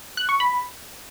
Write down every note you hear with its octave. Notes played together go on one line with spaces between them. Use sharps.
F#6
C#6
B5